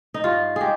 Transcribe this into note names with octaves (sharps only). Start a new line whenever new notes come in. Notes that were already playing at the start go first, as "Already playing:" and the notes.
D#4
G2 F4
G#3 G4 G#4